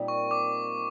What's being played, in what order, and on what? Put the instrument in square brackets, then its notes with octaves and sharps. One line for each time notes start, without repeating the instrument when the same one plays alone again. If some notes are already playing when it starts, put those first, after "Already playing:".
Already playing: [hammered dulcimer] A#2 G3 A#3 C4 D#4
[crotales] C#6
D6